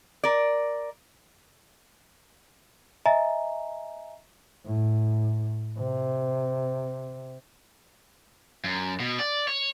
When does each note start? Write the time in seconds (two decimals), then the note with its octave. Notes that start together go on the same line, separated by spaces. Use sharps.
0.24 A#4 D5
3.06 D#5 E5 G#5 A#5
4.65 A2
5.79 C3
8.64 F#2
9.00 B2
9.19 D5
9.48 C#5